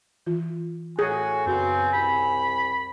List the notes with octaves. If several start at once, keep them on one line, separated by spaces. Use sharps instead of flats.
E3 F4
A2 F#4 G#4 G#5
F#2 C#3 B3 C4 F#4
C2 C3 B5